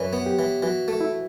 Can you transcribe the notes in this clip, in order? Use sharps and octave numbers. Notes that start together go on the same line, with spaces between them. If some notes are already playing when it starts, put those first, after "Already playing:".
Already playing: F#2 E3 B4 C#5 D5
B3
G4
E3
E3 F#4
A3
E4